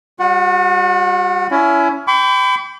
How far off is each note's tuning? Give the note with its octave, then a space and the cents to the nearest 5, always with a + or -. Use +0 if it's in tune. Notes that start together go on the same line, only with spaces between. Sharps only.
G3 +10 F#4 -40 F#5 +0
C#4 +25 E4 +20
G5 +0 B5 +40 D6 -45